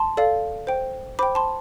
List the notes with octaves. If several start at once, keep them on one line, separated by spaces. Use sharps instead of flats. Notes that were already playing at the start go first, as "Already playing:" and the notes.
Already playing: A5 C6
A4 D5 F5
C5 G5
C5 G5 B5 D6
A5 C6